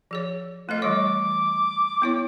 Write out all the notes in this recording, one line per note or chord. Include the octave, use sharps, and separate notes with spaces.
F3 G#4 C#5
A3 F4 A4 D#5
E3 G3 C#5 D6
B3 E4 C#5